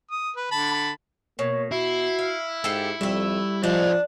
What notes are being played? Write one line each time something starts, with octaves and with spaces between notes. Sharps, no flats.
D#6
B4
D3 A5 B5
B2 A#3 C#5
E4 F#4 C7
F5
G#2 F4 G4 A4 C#7
F2 G3 A3 E5
F3 D4 C5 D#5